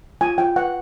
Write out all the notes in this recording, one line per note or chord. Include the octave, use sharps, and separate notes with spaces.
F4 G#5
F4 G5
B4 F#5